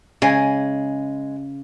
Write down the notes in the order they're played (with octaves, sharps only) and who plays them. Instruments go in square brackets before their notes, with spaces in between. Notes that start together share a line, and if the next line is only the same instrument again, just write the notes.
[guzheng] C#3 [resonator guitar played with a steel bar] G#3 G#5